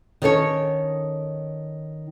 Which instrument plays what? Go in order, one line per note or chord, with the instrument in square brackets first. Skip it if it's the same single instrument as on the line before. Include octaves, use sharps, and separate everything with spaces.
[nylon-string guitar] D#3 C#4 A4 C#5